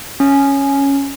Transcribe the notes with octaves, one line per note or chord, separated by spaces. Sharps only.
C#4